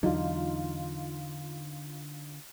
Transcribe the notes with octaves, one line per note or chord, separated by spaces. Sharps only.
E2 D3 F#3 D#4 F4